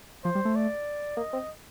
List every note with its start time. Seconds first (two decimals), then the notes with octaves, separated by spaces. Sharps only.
0.24 F3 C5
0.35 G3
0.45 A3
0.56 D5
1.17 A#3 D#5
1.33 C4